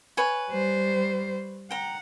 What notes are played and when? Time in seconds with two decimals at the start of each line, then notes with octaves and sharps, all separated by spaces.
0.17 B4 C#5 G#5
0.50 G3 C5
1.71 F#5 G5 A#5